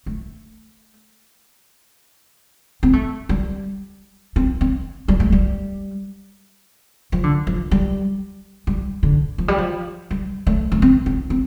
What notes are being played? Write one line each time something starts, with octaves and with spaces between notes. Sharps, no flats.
A3
C4
A3
G3
C4
C4
G3
A3
G3
F3
D3
F3
G3
G3
D3
F3
G3
F3
G3
A3
A3
C4
C4
C4